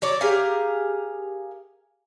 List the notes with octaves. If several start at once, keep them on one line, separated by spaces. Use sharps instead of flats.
F#3 C#5 D5
G4 G#4 A#4 F5